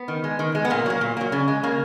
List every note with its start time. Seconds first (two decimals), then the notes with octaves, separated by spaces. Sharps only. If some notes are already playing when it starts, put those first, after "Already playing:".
Already playing: B3
0.08 D#3
0.24 G#3
0.39 D#3
0.55 G#3
0.65 B3
0.70 A#2 A#3
0.86 F#3 A#3
1.01 A#2
1.17 F#3 A#3
1.32 C#3
1.48 G#3
1.63 C#3 A#3